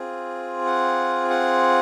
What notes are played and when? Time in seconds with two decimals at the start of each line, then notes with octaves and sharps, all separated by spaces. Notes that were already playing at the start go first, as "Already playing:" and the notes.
Already playing: C4 F4 G#4
0.66 F#5
1.30 F#5